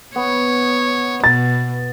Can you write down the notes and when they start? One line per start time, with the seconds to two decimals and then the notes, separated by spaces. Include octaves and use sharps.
0.16 B3 C#5
1.24 B2 A6